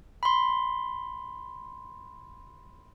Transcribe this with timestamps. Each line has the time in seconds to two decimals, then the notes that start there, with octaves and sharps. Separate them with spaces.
0.23 B5 C6